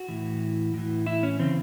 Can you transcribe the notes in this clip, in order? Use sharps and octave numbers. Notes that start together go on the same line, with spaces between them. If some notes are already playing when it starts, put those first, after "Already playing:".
Already playing: F#4
A2 E3
A2 E3
E4
C#4
C#3 E3 C4